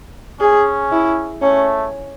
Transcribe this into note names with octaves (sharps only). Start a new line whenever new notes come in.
C#4 G#4
E4
A3 C#4